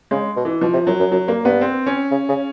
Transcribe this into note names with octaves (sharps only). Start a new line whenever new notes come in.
C#3 G#3
B2
E3
B2 F3
C3
F#2 F#3
F#2
F#2 F#3
G2 A#3
G2 B3
C4
C#4
C#3
C#3